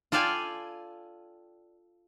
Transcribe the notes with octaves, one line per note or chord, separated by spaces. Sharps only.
F4 A4 D5 F5 G5 G#5